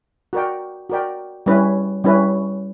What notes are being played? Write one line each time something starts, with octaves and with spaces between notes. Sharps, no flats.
F#4 A#4 D5 G5
F#4 A#4 D5 G5
G3 C#4 E4 B4
G3 C#4 E4 B4